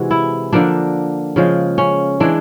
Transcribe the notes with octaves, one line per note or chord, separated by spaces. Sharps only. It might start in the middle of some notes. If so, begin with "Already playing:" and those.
Already playing: C3 E3 G#3 F#4
E4
D3 F3 A#3 D4
C#3 F3 G#3
C#4
E3 G#3 D4